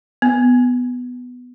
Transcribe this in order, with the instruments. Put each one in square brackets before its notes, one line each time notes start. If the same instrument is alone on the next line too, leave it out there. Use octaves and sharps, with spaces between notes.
[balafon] B3